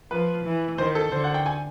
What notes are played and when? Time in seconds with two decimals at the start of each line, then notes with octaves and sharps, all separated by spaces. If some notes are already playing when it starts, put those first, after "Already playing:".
0.11 F3 B4
0.45 E3
0.78 D#3 C5
0.95 A4
1.12 D3 C5
1.24 F#5
1.34 G5
1.46 G#5